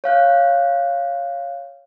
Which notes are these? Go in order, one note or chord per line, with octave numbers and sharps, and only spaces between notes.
C#5 F5 F#6 G6